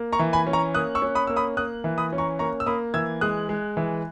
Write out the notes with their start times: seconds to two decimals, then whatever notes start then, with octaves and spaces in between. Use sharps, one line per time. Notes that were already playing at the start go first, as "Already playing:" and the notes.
Already playing: A#3
0.13 A#5 C#6
0.19 E3
0.33 G#5 B5
0.46 C#4
0.53 A#5 C#6
0.74 A#3 D#6 F#6
0.95 C#6 E6
1.02 C#4
1.15 B5 D#6
1.27 A#3 E6
1.36 B5 D#6
1.57 A#3 D#6 F#6
1.84 E3
1.98 B5 D#6
2.13 C#4
2.18 A#5 C#6
2.39 A#3 A#5 C#6
2.60 E6
2.66 A#3 B5 D#6
2.94 E3 E6 G#6
3.21 G#3 D#6 F#6
3.49 G#3
3.77 E3